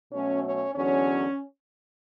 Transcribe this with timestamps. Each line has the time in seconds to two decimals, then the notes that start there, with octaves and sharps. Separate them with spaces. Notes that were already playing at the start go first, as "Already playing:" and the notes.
0.12 B2 F#3 A3 C#4
0.44 C#4
0.75 E2 D3 F#3 C#4